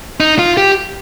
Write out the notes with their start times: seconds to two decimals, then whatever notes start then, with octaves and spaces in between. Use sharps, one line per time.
0.20 D#4
0.39 F4
0.57 G4